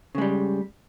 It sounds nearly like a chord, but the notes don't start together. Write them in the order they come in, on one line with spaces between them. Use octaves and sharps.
C#3 G#3 G3